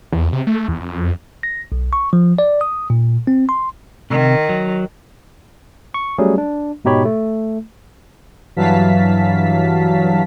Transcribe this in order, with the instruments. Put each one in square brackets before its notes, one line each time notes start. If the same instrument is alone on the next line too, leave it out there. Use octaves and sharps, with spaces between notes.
[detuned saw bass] E2
C3
A3
E2
F2
[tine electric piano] A#6
B1
C#6
F3
D5
D#6
A#2
C4
C6
[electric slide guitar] C3 [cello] D#3
[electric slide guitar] F#3
[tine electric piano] C#6
F#3 G3 A3 C#4 G#4
D4
G#2 B2 D#4 G4 C#5 B5
A3
[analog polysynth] G2 E3 F#3 F5 A5 B6